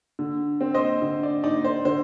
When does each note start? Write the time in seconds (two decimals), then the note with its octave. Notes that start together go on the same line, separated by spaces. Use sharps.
0.19 D3
0.61 C4
0.74 C5 D#5
1.02 D3
1.23 D5
1.44 D#4 D5
1.64 C5
1.85 D3 C5